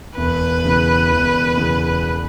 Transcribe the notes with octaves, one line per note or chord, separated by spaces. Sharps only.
E1 B4
E2 C#3
E1
E2 C#3